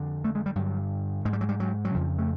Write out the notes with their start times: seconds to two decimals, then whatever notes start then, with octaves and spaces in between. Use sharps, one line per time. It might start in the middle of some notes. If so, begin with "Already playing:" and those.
Already playing: F2 D3
0.24 A3
0.35 G#3
0.46 G3
0.55 G2 D3 F#3
1.25 G#2 G#3
1.33 G3
1.41 F#3
1.49 G3
1.60 F#3
1.85 F#3
1.95 F2 C#3 F3
2.18 A3